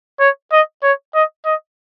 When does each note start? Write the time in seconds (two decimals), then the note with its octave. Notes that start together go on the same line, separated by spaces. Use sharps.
0.20 C#5
0.52 D#5
0.83 C#5
1.14 D#5
1.45 D#5